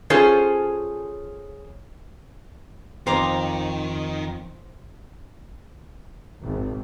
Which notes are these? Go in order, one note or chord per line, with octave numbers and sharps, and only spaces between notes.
C#4 F4 G#4 A4 C5 C#5
F2 D#3 C5 A#5 D6
G#1